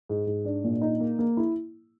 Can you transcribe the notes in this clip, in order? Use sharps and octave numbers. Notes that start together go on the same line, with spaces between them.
G#2
G#2
D4
A#2
D#4
A#3
A#3
E4